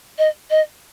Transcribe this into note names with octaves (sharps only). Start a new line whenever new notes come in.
D#5
D#5